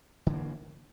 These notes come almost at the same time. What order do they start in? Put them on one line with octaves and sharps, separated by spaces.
D3 E3 A#3